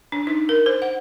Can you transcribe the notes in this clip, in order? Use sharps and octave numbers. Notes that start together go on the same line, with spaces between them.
D4
D#4
A#4
C5
F#5